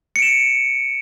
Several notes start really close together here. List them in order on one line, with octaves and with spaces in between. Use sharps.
C#7 D7 E7